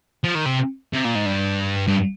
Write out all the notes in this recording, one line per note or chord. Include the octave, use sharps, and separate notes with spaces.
F3
D#3
C3
C3
A#2
G#2
G2
G2